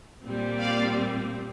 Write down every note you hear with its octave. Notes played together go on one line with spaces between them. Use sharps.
A#2 G3 C4
D5 F5